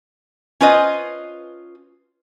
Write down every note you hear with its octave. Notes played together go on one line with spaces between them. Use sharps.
C#4 F4 B4 C5 D#5